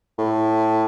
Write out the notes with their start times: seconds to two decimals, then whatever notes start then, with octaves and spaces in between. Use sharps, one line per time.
0.18 A2